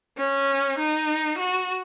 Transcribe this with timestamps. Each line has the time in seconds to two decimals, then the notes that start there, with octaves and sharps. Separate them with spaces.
0.18 C#4
0.79 D#4
1.38 F#4